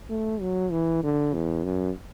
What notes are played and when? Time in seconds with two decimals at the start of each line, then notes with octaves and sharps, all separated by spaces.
0.10 A3
0.41 F#3
0.72 E3
1.03 D3
1.34 E2
1.64 F#2